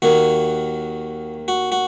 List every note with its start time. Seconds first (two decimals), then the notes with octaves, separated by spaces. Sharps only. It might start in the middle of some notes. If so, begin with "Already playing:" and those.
0.02 D#2 D#3 A#3 F#4
1.48 F#4
1.72 F#4